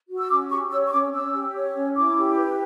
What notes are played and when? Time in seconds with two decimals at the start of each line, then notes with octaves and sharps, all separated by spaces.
0.09 F#4
0.19 E6
0.30 C#4 D6
0.49 G4 C#6
0.70 C#5 E6
0.87 C#6
0.91 C#4 D6
1.13 C#4 E6
1.34 G4
1.54 C#5
1.75 C#4
1.96 E4 D6
2.16 G4
2.37 B4